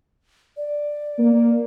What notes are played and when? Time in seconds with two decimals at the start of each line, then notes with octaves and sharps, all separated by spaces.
0.57 D5
1.19 A#3